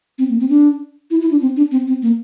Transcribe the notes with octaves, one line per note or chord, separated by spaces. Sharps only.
C4
A#3
C4
D4
E4
E4
D4
C4
D4
C4
C4
A#3